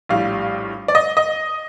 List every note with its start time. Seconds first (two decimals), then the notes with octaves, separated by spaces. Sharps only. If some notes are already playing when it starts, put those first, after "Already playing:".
0.09 A#1 A2 G3 F5
0.88 D5
0.95 D#5
1.17 D#5